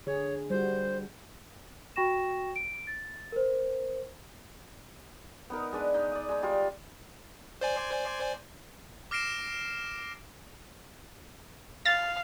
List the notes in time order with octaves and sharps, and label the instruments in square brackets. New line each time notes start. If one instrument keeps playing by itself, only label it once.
[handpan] D3 G#4 [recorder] C#5
[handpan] G3 F#4 [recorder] C5
[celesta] F#4 G5 C#6 A#6 E7
D7
A6
A#4 C5
[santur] B3 D#4 A#4
G#3 D4 B4
D#4
D5 D#6
G#3 D#4
G3 F4
[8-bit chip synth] C5 D5 G#5
[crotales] D6 F6 A#6 C7 D7 E7
[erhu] F5 [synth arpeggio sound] A6